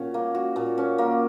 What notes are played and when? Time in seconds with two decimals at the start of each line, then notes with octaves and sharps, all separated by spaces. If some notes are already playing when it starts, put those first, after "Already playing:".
Already playing: A#2 C#4 F#4
0.14 A#3
0.35 F#4
0.56 A#2
0.78 C#4
0.98 A#3